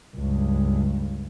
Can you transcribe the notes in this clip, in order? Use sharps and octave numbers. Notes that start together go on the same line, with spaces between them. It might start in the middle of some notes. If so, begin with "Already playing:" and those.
C#2 G2